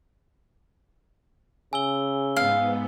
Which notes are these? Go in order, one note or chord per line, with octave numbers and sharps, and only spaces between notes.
C#3 G#5 E6 G7
G#2 B3 F5